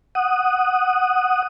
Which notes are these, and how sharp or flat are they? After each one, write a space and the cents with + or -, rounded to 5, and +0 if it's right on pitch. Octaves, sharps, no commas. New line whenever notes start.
F#5 +0 D#6 +0